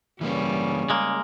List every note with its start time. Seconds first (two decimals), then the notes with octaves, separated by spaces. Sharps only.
0.21 C#3 E3 G3 A#3 B4
0.90 G#3 A#3